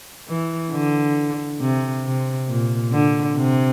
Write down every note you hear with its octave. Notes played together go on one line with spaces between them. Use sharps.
E3
D3
C3
C3
A#2
D3
C3